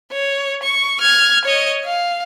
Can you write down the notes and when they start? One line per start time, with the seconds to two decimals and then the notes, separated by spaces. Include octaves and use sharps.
0.12 C#5
0.63 C#6
1.01 F6 G#6
1.45 C#5 D#5
1.85 F5